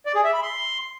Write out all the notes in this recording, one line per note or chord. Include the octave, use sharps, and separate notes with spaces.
D5
G#4
E5
B5
C6